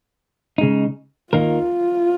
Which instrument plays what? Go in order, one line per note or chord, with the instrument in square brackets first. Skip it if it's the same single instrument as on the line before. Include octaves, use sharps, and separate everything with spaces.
[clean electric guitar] C#3 G#3 D#4
[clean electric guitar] D#2 D#3 A#3 D#4 A#4 [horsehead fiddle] F4